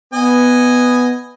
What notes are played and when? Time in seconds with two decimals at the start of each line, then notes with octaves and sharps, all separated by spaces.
0.13 B3 D#5 G#5